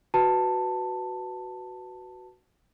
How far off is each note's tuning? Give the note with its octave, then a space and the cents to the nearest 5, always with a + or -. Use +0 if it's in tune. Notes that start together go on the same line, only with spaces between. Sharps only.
F#4 +0 B4 +0 A5 +10